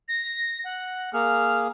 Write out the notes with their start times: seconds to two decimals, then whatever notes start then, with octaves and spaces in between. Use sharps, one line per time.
0.08 A#6
0.64 F#5
1.13 A#3 G#4 F6